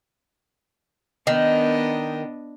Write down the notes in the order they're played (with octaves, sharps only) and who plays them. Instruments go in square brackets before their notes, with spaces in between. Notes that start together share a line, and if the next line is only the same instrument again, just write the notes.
[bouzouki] D#3 [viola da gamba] B3 D4 D#5